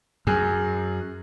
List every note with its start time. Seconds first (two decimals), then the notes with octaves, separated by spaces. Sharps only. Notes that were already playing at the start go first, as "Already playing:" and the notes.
0.27 F#2 G#4